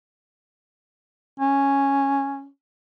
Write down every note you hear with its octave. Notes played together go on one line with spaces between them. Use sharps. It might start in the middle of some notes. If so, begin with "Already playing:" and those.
C#4